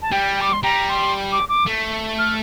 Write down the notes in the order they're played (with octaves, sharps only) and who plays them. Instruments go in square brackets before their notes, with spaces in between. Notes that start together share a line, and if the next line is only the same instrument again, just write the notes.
[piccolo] A5
[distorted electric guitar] G3 [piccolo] G5
[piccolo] D6
C6
[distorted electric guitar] G3 [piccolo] A#5
[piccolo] C6
D6
D6
[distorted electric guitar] A3
[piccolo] F6